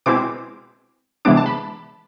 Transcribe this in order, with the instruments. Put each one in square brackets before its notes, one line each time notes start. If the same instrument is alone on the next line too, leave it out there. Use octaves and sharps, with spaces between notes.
[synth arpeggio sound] B2 G#3 C4 E4 D6
C3 E3 G#3 B3 D4 D6
A5
B5